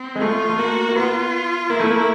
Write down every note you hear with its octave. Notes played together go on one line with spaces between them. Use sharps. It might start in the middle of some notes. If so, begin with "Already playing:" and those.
Already playing: C4
G#3
A3 F4
A3
A#3 F#4
A#3
B3 F4
A#3 E4
A3
A#3